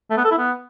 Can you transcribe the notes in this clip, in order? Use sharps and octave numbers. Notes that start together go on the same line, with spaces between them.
A3
B3
A4
E4
B3